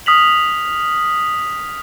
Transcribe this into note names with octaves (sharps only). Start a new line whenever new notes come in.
D#6 F6 B6 F7 F#7